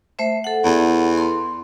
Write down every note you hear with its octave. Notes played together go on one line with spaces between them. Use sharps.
A3 C5 E5
A4 F#5
E2
C6